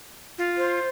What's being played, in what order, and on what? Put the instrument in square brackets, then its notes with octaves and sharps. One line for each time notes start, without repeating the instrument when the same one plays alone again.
[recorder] F4
[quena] C5